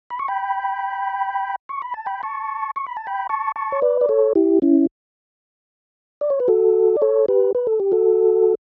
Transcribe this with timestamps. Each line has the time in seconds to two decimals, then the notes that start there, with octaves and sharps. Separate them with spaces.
0.10 B5
0.19 C#6
0.28 G5 B5
1.69 C#6
1.82 B5
1.94 A5
2.06 G5 B5
2.23 A5 C#6
2.76 C#6
2.87 B5
2.97 A5
3.07 G5 B5
3.29 A5 C#6
3.56 A5 C#6
3.72 C#5
3.82 B4 D5
4.01 D5
4.09 A4 C#5
4.35 E4 G4
4.62 C#4 E4
6.21 D5
6.30 C#5
6.40 B4
6.48 F#4 A4
6.96 D5
7.02 A4 C#5
7.28 G4 B4
7.55 B4
7.67 A4
7.80 G4
7.92 F#4 A4